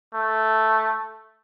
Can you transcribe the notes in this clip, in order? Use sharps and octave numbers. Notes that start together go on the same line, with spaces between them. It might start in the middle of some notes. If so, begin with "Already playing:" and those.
A3